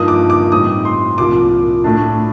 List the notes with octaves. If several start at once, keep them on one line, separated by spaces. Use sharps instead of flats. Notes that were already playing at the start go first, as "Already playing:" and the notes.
Already playing: G2 F3 A#3 D#4 D#6
D6
D6
A2 G3 C4 D#4 D#6
C6
C2 A#2 F3 A#3 D6
A2 A3 D4